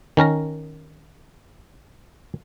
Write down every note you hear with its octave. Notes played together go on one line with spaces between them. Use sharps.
D#3 C#4 A#4 A#5